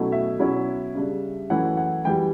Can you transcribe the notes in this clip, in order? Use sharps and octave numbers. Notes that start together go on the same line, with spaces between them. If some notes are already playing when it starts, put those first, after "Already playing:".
Already playing: B2 F#3 A3 C#4 E4
E5
B2 F#3 C#4 E4
C#3 G3 D4
F#2 E3 A3 C#4 E4 F#5
F#5
F#2 E3 G3 G5